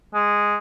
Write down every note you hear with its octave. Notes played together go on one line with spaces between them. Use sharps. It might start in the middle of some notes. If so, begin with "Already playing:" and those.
G#3